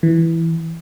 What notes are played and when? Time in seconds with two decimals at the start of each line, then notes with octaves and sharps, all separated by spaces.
0.03 E3